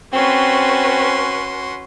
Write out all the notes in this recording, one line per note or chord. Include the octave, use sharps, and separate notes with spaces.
C4 C#4 F#4 B4 C6